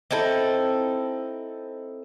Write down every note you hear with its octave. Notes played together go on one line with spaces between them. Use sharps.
C4 D#4 E4 A4